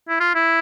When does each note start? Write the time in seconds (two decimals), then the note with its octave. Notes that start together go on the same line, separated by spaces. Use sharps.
0.09 E4
0.20 F4
0.35 E4